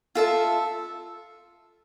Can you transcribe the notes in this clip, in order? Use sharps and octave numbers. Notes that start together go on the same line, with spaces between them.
F4 A4 E5